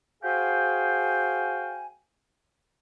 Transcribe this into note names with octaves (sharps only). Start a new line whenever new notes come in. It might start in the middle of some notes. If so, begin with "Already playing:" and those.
F#4 G#4 C5 F5 G5 G#5